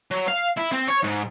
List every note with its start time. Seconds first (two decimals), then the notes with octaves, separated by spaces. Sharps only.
0.11 F#3
0.28 F5
0.57 E4
0.72 C4
0.88 C#5
1.04 G#2